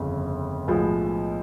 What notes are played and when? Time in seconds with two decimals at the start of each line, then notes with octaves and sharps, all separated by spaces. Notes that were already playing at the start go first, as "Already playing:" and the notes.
Already playing: G1 F2 C#3
0.67 B1 A2 F3 G#3 B3